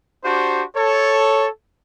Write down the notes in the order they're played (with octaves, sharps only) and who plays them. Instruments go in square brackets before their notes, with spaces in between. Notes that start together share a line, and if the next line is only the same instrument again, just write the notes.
[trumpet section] D4 F#4 G4 C5
A4 C#5